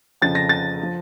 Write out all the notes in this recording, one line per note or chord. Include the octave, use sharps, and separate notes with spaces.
F2 C#3 F3 A6
A#6
A6
F3